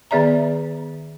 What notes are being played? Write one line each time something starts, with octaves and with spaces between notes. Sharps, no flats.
D#3 B3 G#4 D5 E5 A#5